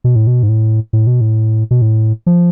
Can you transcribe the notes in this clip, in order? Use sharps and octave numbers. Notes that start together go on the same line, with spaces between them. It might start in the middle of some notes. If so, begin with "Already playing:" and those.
B2
A2
B2
G#2
A2
A2
B2
A2
B2
A2
F3